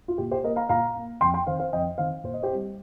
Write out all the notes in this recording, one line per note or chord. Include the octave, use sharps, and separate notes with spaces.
F4
A#2 G4
G4 C5
A#3 A#4 D#5
F5 A#5
A#2 F5 A#5
A#3
F2 G5 C6
G5 C6
D#3 C4 C5 F5
C5 F5
F2 D#5 G5
D#3 C4 C5 F5
A#2 C5
D#5
G4 C5
G3 C4